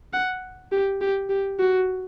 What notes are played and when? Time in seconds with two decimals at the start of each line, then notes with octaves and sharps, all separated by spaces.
0.13 F#5
0.72 G4
1.01 G4
1.29 G4
1.59 F#4